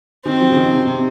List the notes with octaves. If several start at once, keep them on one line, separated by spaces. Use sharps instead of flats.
D#3 C4
F3
C#3
D#3
C3
C3